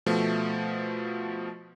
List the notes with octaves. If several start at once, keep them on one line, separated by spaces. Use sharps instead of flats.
B2 F3 A3